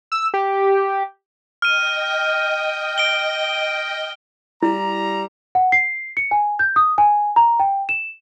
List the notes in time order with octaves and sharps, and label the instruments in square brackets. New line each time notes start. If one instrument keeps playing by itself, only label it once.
[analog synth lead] E6
G4
[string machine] D#5 G5 [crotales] F6 D#7
[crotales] D7 G7
[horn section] G3 A#5 [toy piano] E4
[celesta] F#5
C7
C#7
G#5
G6
D#6
G#5
A#5
G5
E7